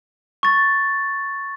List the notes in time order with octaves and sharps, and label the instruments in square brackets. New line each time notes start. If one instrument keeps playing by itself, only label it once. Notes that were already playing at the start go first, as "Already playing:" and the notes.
[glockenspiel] C#6 A6